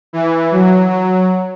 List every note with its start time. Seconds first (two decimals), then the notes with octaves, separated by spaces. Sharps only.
0.13 E3
0.52 F#3
0.90 F#3